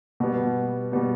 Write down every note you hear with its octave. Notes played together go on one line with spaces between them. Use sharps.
B2 G3 B3
B2 G3 B3